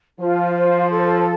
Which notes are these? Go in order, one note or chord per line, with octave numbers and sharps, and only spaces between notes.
F3 F4
C5
A4